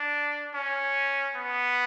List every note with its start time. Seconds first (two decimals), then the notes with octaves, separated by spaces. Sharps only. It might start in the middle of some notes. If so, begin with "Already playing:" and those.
Already playing: D4
0.54 C#4
1.36 B3